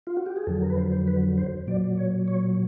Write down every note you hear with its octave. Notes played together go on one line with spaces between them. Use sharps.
F4
F#4
G4
G#4
F2 D3 F#3 A4
A#4
B4
C5
C5
B4
C5
A#2 F#3 D5
C#5
C#5